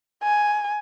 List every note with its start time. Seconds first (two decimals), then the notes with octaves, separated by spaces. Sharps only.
0.23 G#5